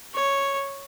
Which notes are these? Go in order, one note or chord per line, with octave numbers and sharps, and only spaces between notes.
C#5